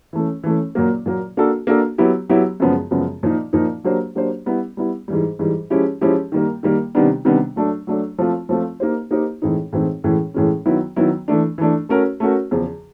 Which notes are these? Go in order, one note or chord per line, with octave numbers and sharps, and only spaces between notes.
E3 A3 C#4
E3 A3 C#4
A#2 F#3 A#3
A#2 F#3 A#3
A#3 D4 F#4 A4
A#3 D4 F#4 A4
F#3 B3 E4 G4
F#3 B3 E4 G4
F#2 C#3 F3 G#3 B3
F#2 C#3 F3 G#3 B3
A#2 F3 A#3 D#4
A#2 F3 A#3 D#4
F#3 A#3 D4 G4 C5
F#3 A#3 D4 G4 C5
G3 B3 E4
G3 B3 E4
G#2 E3 G3
G#2 E3 G3
F3 G#3 C#4 E4 G4
F3 G#3 C#4 E4 G4
D#3 G3 A#3
D#3 G3 A#3
C3 D#3 G3 B3 D4
C3 D#3 G3 B3 D4
F#3 A3 D4
F#3 A3 D4
F3 A3 C4 F4
F3 A3 C4 F4
A#3 D#4 G4 C5
A#3 D#4 G4 C5
A2 E3 G#3 C4 D#4
A2 E3 G#3 C4 D#4
A2 E3 G#3 C#4
A2 E3 G#3 C#4
D#3 F#3 B3 E4
D#3 F#3 B3 E4
E3 A3 D4
E3 A3 D4
A3 C#4 F#4 A#4
A3 C#4 F#4 A#4
E2 C#3 F3